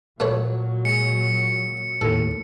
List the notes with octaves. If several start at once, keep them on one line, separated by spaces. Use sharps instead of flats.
A#2 F#3 A3 B4 C#5
G#3 C#7
D#2 A2 A4